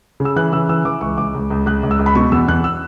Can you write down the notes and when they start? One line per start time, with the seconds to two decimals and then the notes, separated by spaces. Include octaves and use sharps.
0.20 C#3
0.25 E6
0.36 E3 F#6
0.52 C#3 E6
0.69 E3 E6
0.85 E3 D6
1.01 C#2 C#6
1.18 C#2 D6
1.35 C#2
1.50 C#2
1.66 C#2 F#6
1.83 C#2
1.91 E6
1.99 C#2
2.06 B5
2.15 B2 C#6
2.32 E2 E6
2.48 E2 F#6
2.64 E6